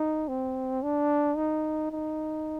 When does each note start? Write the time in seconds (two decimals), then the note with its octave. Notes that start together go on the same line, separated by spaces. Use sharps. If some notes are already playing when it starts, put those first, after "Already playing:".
Already playing: D#4
0.28 C4
0.83 D4
1.37 D#4
1.92 D#4